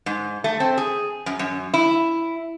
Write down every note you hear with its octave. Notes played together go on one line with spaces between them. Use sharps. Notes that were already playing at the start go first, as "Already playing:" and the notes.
G#2
A3
C4
G#4
F#2
F#2
E4